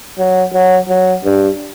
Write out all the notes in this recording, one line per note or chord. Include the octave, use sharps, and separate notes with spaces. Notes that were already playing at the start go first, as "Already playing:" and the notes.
F#3
F#3
F#3
G2